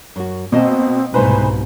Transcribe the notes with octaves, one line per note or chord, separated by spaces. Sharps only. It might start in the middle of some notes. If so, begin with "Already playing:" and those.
F#2 F#4
B2 A#3 C4 D#5 A5
C2 G#2 B2 A3 D#4 B4 C5 G#5